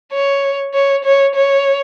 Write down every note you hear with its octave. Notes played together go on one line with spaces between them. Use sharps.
C#5
C#5
C#5
C#5